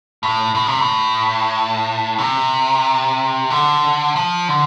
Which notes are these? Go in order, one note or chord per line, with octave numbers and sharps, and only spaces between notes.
A2
A2
C3
A2
C3
D3
F3
D3